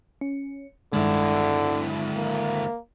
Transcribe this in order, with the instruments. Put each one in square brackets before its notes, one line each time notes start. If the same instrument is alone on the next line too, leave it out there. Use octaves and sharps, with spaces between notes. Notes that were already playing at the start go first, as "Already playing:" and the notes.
[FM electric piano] C#4
[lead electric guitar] D2 E4 [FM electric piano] G2 D#3 G#3 [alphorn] D3
[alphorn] A#3